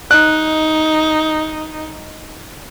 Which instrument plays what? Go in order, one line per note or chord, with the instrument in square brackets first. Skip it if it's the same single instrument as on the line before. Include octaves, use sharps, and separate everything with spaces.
[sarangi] D#4 [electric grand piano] F#6